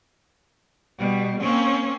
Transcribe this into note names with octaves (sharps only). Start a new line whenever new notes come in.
B2 G3
A#3 C4 C#4